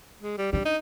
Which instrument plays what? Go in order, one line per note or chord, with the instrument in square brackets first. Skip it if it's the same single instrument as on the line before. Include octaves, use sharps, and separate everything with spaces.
[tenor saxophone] G#3
G3
[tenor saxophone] G3 [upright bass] D4
[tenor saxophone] D#4